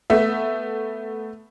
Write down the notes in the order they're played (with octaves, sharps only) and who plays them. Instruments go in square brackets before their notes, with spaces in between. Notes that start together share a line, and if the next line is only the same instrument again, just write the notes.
[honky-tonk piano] A3 B3 E5